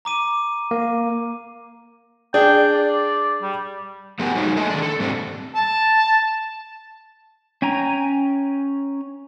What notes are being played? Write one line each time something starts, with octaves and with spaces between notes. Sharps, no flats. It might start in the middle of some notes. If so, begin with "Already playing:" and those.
A#5 D6 D#7
A#3
D4 G#4 G5
D5
G3
A3 B3 G4 G#4 A#4 F#5
F#3 G#3 D#4 E4 G#4 C#5
G#4 A4 D#5 G#5
D#3 D4
A4
G#2 G3 A3 C4 D4
A5
C#4 G5 G#5 A#5